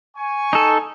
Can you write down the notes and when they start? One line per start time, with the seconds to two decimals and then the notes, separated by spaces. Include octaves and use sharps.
0.17 G#5 C#6
0.53 D#4 A4